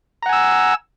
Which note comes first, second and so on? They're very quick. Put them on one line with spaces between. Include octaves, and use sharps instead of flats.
A#5 F#5 G#5 E6